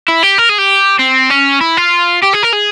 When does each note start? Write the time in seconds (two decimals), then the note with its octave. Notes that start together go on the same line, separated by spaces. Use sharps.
0.08 E4
0.23 G4
0.38 A#4
0.49 G#4
0.58 G4
0.99 C4
1.30 C#4
1.61 E4
1.77 F4
2.23 G4
2.34 G#4
2.43 A#4
2.53 G#4